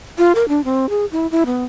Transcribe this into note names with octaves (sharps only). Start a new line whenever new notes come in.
F4
A#4
D4
C4
G#4
E4
E4
B3